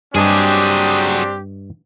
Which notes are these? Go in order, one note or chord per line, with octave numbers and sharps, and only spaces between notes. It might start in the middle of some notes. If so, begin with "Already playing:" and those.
G2 F#3 C4 D4 G4 G#4 D#5 A5